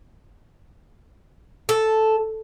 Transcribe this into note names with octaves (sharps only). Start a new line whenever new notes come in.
A4